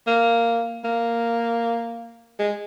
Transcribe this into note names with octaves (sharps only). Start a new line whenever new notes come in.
A#3
A#3
G#3